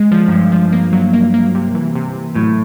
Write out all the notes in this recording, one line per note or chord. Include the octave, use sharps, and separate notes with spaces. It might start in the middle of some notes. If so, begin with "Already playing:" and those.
Already playing: G#3
F3
F#2
G2 F3
F3
A#3
F#3
A#3
A#3
C3
E3
C3
C3
A2 F#3